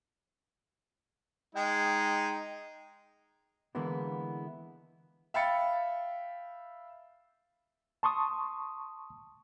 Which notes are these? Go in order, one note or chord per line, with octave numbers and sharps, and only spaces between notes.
G#3 D#4 G5
D3 E3 G#3 A#3 B3 E4
E5 F5 G5 B5 A6 C#7
A5 C6 C#6 D#6